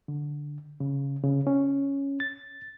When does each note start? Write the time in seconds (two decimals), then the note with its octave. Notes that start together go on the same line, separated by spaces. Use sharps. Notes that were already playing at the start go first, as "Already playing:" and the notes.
0.08 D3
0.80 C#3
1.23 C#3
1.47 C#4
2.20 A6